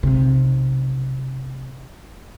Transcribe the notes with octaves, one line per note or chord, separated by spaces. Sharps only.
B1 C3